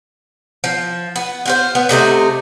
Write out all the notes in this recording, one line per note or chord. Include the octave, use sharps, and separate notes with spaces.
F3
B3
F4 F#4 C5
B3
C3 A3 D#4 C5